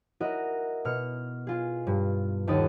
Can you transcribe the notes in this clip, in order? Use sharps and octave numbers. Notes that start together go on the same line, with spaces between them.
E4 F#4 A#4 D#5
B2 F6 C#7
F4 G#4
G2
G1 D#2 A4 D#6